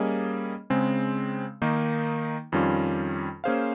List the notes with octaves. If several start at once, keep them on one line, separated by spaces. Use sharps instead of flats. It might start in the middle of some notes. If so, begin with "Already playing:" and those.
Already playing: G3 A#3 C#4 G#4 D#5
C#3 G#3 C4
D#3 A#3 D#4
F2 D#3 G3 C#4 F4
A#3 C#4 G#4 C5 F5